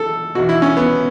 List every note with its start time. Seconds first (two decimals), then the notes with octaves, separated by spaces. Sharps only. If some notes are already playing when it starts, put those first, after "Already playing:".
Already playing: A4
0.35 E2 B2 F#4
0.49 E4
0.62 C#4
0.77 B3